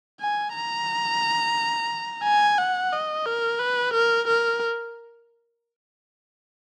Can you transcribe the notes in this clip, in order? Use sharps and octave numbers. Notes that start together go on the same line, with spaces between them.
G#5
A#5
G#5
F#5
D#5
A#4
B4
A#4
A#4